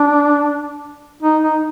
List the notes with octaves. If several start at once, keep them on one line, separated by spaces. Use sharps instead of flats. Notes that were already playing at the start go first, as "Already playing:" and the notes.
Already playing: D4
D#4
D#4